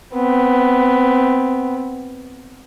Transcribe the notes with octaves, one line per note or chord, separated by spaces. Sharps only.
B3 C4